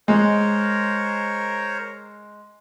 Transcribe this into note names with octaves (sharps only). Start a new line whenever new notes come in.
G#3 A#4 C5 C#5